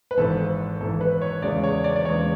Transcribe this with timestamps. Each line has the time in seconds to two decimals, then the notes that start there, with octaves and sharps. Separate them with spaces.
0.11 B4
0.17 G#1 G#2 E3 A4
0.80 G#1 G#2 E3 A4
1.01 B4
1.22 C#5
1.42 E2 C#3 G#3 D5
1.64 C#5
1.84 D5
1.96 D5
2.05 E2 C#3 G#3 C#5